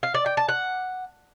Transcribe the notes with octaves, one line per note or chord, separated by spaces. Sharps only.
F5
D5
G5
A5
F#5